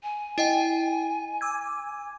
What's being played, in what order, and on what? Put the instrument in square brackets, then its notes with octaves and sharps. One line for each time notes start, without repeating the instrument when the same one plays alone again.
[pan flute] G#5
[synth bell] E4 D#5 G5
D6 E6 G#6